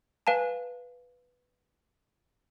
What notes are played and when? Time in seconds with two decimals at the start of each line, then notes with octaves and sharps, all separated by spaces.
0.27 B4 F5 G#5 A5